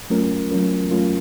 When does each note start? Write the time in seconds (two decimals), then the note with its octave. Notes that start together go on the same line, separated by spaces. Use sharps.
0.10 F#3 A3 C#4 F4 A#4
0.51 F#3 A3 C#4 F4 A#4
0.91 F#3 A3 C#4 F4 A#4